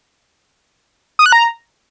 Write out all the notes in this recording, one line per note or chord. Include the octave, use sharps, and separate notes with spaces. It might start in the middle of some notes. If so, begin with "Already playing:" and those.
D#6
F#6
A#5